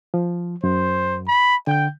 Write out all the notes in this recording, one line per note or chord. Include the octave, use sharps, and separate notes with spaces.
F3
F#2 C5
B5
D3 G5 G6